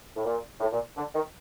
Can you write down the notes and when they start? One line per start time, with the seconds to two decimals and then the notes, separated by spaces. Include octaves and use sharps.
0.15 A2
0.24 A#2
0.60 A2
0.72 A#2
0.96 D3
1.14 D#3